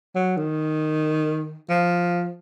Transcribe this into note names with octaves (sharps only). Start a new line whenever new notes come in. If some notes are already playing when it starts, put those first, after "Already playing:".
F#3
D#3
F3